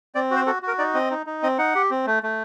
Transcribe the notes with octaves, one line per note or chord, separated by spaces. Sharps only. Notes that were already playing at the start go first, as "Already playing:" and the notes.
C4 D5
F#4 C5
F#4 A4
F#4 A#4
D#4 D5
C4 D#5
D#4
D#4
C4 D#5
D#4 F#5
G4
C4
A3
A3